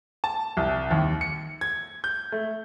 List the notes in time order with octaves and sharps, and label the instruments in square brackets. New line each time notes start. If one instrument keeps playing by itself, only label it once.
[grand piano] A5
C2
D#2
C#7
G#6
G6
A3